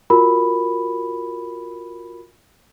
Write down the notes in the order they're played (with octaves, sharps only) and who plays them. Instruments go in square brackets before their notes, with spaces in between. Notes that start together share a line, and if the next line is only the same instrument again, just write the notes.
[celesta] F4 F#4 A#4 B5